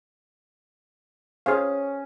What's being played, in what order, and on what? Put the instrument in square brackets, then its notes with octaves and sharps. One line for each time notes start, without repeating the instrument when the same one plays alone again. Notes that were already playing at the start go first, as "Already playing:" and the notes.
[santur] C#4 [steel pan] G#4 C5 F5